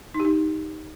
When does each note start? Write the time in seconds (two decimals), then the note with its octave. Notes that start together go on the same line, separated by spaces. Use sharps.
0.14 D#4
0.20 G4
0.25 D#4